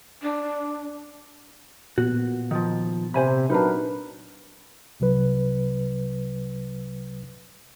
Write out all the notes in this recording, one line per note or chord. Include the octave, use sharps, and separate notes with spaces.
D4
A#2 B3 F#4
D#3 F3
C3 C5 G#5 B5
F#3 D4 D#4 A#4 B4
C2 C3 F#3 B4